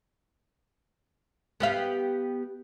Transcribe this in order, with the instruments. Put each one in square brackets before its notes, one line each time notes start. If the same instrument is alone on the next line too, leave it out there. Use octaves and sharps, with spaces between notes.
[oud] B3 G4 F5